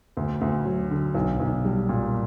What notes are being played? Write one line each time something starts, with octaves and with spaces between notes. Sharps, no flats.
D2
D2
F#3
D3
B1
B1
G3
A#2